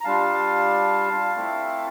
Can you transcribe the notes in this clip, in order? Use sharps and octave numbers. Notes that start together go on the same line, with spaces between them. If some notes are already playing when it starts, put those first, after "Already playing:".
A#5
G3 D4 F4 F5 A5
A3 C4 E4